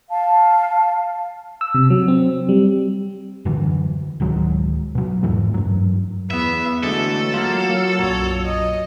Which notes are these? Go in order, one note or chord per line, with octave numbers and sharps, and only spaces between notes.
F5 A5
E6
C3
F#3
C4
G3
F#2 D3 E3 F#3
D1 D#3 F#3 G#3
B2 F#3
E2 G#2 E3 A3
G2 F#3
E2 B3 E5
D3 E3 F#3 G#3 A3 A4
A#3 F4
B1 F#2 A#2 C#5
D#5